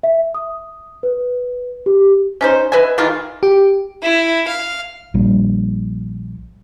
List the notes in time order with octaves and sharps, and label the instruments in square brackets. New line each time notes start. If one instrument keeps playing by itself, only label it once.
[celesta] E5
D#6
B4
G4
[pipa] C#4 D#4 C5
B4 D#5 E5 G#5
D#3 E3 F4 G#4
[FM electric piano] G4
[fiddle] E4
F5
[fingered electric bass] A#1 A#2 G3